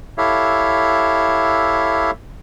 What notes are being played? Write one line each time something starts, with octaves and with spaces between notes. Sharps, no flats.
E4 G4 A4 C#5 E5 F5